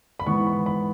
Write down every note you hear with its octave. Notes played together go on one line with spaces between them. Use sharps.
B5
G#2 E3 B3 C#6
B5
B5